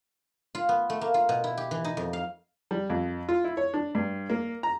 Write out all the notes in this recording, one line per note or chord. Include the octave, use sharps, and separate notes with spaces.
F4
B3
A3
A#3
F4
B2
E4
G4
E3
D#4
F2
F5
G3
F2
F4
E4
C#5
D4
G2
A#3
A#5